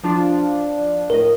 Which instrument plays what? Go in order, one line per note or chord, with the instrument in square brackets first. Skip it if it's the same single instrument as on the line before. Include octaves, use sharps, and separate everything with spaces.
[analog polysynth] F3 D4 F4
[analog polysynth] A2 D#5 [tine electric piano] A#4